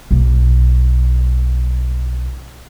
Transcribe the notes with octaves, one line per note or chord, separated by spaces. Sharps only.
B1 A#3